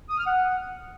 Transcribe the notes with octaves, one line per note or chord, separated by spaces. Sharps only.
D#6
F6
F#5